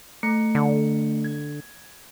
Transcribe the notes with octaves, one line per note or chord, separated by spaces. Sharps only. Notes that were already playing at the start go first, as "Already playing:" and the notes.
A3 C#7
D3
G#6